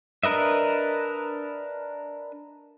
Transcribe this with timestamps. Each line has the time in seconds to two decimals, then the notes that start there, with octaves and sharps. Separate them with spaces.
0.23 D4 A#4 B4 D#5 E5